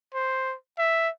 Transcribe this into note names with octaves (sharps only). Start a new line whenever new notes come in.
C5
E5